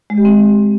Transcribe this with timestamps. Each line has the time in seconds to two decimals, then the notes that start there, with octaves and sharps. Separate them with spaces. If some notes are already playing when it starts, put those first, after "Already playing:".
0.10 G#3
0.18 G4
0.25 C4